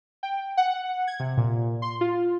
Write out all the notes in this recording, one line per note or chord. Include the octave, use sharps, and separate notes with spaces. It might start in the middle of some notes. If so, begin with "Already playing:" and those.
G5
F#5
G#6
C3
A#2
C6
F4